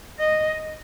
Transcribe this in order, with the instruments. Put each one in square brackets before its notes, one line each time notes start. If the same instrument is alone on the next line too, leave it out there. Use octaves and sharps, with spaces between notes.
[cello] D#5